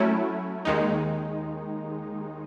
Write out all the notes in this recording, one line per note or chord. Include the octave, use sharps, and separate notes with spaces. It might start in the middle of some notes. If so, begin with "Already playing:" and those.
Already playing: F#3 A3 C#4 E4
D#2 D#3 G#3 D#4